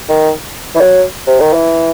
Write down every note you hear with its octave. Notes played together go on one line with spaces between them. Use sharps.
D#3
E3
F#3
C3
D#3
E3